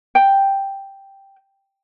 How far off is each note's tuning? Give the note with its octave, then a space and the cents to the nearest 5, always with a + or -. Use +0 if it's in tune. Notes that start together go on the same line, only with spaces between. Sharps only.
G5 +0